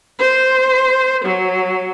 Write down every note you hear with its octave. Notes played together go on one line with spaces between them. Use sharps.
C5
F#3